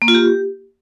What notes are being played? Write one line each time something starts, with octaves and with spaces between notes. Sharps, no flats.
A#3
F4
G4